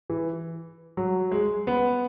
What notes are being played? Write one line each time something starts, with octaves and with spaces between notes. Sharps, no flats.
E3
F#3
G#3
B3